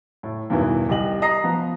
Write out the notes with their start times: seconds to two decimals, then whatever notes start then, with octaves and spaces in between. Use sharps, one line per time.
0.23 A2
0.50 E2 G2 B2 D#3 E3
0.89 C2 G4 D#5 F#7
1.22 D#5 A#5 D#6 A#6 C7
1.44 F3 B3